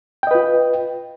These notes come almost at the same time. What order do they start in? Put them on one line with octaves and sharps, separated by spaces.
G5 D#5 B4 F4